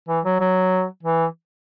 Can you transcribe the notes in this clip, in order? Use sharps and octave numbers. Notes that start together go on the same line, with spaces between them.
E3
F#3
F#3
E3